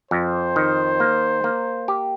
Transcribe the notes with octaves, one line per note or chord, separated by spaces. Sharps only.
F2 C5
D#3
A#3
A#3
G4